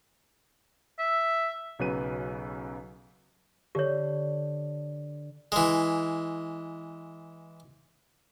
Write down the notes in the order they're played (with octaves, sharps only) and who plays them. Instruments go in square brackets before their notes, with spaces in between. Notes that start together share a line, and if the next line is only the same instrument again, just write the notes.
[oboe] E5
[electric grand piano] B1 C#3 F#3 B4 D#7
[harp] D3 [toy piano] G4 C#5
[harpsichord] E3 G#3